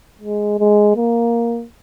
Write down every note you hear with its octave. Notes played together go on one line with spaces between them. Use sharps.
G#3
G#3
A#3